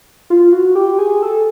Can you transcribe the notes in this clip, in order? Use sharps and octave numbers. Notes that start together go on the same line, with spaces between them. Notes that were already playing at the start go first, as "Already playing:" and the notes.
F4
F#4
G4
G#4
A4